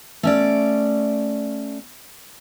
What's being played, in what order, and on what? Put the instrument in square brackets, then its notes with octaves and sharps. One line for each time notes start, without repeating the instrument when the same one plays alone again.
[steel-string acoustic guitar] A3 C#4 D5